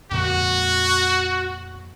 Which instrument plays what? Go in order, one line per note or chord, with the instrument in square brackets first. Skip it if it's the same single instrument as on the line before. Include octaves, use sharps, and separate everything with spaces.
[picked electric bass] F2 A#2 [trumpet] F#4